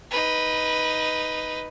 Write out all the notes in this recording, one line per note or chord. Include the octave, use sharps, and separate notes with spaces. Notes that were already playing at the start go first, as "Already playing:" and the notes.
D#4 B4